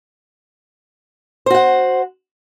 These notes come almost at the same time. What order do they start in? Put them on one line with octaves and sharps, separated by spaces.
C5 F#4 F#5